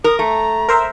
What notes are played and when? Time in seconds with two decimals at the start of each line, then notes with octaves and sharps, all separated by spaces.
0.04 A#4 D#6
0.19 A3 A#5
0.69 A#4 C5 E5